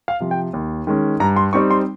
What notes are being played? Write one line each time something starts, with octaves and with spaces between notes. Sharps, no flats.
F5
C3 F3
G5
D#2
D#3 G#3 C#4
G2 A#5
C6
G3 C4 D#4 C#6
C6